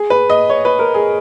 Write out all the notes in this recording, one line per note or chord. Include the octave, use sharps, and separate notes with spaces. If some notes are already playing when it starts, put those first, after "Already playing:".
Already playing: G#4
B4
D#5
C#5
B4
A#4
G#4